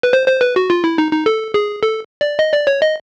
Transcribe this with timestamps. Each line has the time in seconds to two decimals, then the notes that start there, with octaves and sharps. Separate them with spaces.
0.03 B4
0.13 C5
0.28 C5
0.41 B4
0.56 F#4
0.70 F4
0.84 E4
0.98 D#4
1.12 D#4
1.26 A4
1.54 G#4
1.83 A4
2.21 D5
2.39 D#5
2.53 D5
2.67 C#5
2.82 D#5